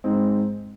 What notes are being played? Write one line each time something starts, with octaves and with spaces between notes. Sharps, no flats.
G#2 G#3 C4